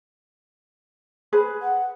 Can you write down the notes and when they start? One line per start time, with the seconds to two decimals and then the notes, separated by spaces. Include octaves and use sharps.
1.33 G#4 B4 C5
1.62 F#5